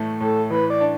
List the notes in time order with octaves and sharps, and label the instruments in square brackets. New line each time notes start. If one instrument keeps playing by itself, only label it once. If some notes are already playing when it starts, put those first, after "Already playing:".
Already playing: [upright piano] A2 E3 A3
[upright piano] A2 [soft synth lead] A4
[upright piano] E3 [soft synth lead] B4
[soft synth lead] D5
[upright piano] D4